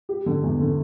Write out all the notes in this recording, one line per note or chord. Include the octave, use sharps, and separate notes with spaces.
G4
D3
E2
D3